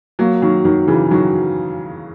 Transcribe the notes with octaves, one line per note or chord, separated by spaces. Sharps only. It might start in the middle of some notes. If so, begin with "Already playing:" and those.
F#3 A#3
D#3 F#3
D#3 F#3
C#3 E3
D#3 F#3